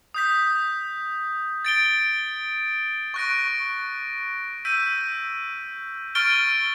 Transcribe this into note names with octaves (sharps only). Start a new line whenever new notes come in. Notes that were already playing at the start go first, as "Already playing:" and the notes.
D#6 G6 B6
A6 D7 G7
C#6 F#6 A#6 D7
E6 G6 B6 D#7
C#6 F6 A6 D7 G7